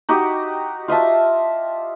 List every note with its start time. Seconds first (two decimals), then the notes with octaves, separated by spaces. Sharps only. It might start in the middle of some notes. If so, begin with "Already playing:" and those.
0.09 D#4 F#4 G4
0.88 F4 D#5 E5 A5